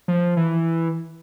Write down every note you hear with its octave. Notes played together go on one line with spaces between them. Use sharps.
F3
E3